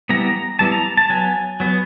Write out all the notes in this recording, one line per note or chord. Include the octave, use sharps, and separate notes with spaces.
E3 G3 B3 A#5
E3 G3 B3 A5
A#5
A5
F#3 B3 G#5
F#3 B3